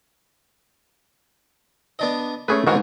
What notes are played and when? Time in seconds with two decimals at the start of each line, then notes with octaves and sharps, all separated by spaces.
1.99 B3 D4 D#5
2.48 A3 C#4 G#4 B4
2.67 G#2 D#3 E3 F#4 F5